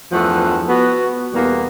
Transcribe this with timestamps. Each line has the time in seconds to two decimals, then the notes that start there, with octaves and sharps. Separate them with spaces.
0.12 E2 G2 F3 A3 A4 F#5
0.68 B3 F#4
1.33 E2 B2 G3 A#3 B3